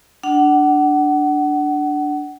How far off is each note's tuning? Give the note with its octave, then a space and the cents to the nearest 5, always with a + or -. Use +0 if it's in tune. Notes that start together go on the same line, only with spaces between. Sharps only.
D4 +0 F#5 +25